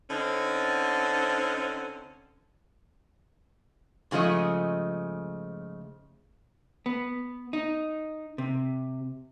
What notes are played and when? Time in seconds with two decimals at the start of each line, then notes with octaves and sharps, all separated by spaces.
0.10 D3 C4 C#4 D#4
4.11 G#2 C#3 F3 A3 D#5
6.86 B3
7.53 D#4
8.38 C3